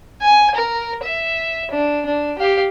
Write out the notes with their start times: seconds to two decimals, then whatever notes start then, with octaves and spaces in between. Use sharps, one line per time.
0.21 G#5
0.55 A#4
1.03 E5
1.71 D4
2.05 D4
2.38 G4 F5